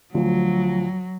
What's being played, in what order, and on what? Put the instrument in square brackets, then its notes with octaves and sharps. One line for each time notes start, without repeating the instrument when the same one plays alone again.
[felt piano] D2 F3 [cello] F#3